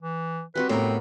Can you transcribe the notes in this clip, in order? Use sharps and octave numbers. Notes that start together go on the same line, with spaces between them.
E3
G3 C4 F#4 B4
A2 B3 C4 A#4